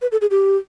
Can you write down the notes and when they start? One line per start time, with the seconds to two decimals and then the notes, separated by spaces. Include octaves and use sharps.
0.02 B4
0.12 A4
0.21 G#4
0.31 G4